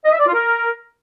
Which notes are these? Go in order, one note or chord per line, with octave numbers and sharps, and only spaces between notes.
D#5
E5
D5
F4
A#4